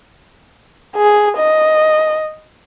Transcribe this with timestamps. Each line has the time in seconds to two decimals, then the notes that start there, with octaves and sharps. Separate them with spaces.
0.96 G#4
1.37 D#5